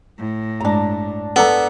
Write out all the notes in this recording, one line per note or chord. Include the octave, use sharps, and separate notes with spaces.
A2
G2 G#3 D4 A#5
B3 A4 D5 A#5